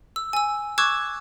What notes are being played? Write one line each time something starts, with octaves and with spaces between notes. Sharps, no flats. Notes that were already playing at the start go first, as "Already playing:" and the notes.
E6
G#5 E6
C#6 D6 E6 F#6 G#6 E7